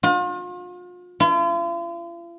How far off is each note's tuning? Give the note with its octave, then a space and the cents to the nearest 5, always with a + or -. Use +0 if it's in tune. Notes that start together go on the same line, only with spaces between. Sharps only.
F4 +40
F4 -45